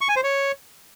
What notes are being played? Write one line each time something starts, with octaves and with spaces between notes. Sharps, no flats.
C#6
G#5
C5
C#5